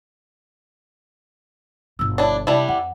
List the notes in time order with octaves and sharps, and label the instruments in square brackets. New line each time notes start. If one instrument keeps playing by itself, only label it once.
[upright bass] G1 B2 [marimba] E6
[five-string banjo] D4 E4 [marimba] C#5
[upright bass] C3 [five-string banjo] G3 D4 E4
[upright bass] F2 [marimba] F#5